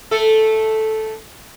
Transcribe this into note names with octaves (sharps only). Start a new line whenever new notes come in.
A3 A4